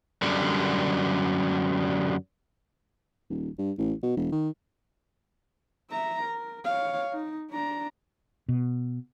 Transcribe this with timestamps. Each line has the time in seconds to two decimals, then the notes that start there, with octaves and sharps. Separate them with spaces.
0.22 F#2 D3 G3
3.30 D#1
3.58 G2
3.78 A1
4.03 B2
4.17 E1
4.32 D#3
5.91 E5 A#5
6.24 A#4
6.65 C#5 F5
7.12 D#4
7.50 D4 A#5
8.48 B2